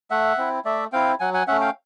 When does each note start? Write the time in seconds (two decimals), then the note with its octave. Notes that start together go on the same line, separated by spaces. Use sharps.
0.11 A3 E5 F#5
0.37 C4 E4
0.65 A3 D5 E5
0.92 C4 E4 F5 G5
1.20 F#3 F#5 G#5
1.34 F#5 G#5
1.47 A3 C#4 E5 F#5
1.61 F5 G5